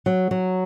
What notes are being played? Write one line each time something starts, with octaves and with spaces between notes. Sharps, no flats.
F#3
F#3